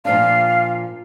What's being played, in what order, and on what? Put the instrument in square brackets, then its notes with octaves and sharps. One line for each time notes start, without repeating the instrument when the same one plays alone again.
[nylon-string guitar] A#2 F3 D4 [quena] F5